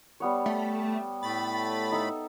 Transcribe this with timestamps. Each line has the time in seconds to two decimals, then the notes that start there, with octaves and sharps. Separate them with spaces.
0.20 G3 B3 C#5
0.46 A3
1.23 A2 A3 B5 A6
1.92 D#4 A4 E5